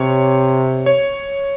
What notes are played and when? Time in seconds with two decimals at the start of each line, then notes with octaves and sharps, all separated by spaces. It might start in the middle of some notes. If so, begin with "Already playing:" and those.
Already playing: C3 C#5
0.86 C#5